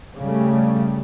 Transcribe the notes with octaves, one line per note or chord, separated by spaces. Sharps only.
C#3 G3 A3